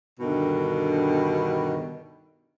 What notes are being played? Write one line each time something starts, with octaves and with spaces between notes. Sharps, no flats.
G2 B2 D3 D#3